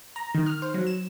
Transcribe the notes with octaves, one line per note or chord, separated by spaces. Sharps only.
A#5
D#3
F6
C5
F#3
E7